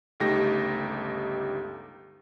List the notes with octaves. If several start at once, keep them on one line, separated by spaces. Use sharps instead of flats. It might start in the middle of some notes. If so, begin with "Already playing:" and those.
G1 C#2 A3 D#4 G4 A#6